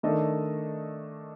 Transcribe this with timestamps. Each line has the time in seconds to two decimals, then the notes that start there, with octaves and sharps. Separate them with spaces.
0.03 D#3 A3 D4 A4 D#5